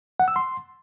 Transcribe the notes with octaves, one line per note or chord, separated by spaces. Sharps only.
F#5
E6
C6